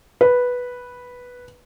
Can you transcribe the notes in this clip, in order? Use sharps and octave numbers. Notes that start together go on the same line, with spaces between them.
B4